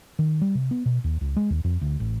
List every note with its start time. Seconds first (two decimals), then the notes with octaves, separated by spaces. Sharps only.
0.19 D#3
0.41 G3
0.55 C3
0.71 B3
0.86 B2
1.04 D#2
1.21 C#2
1.37 G#3
1.50 D#2
1.64 F2
1.81 D2
2.00 A1